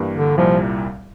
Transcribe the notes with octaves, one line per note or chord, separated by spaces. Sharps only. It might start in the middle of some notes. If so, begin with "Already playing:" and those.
Already playing: G2 E3 G3 A#3
D3
C2 A#2 F3 G3 A#3 E4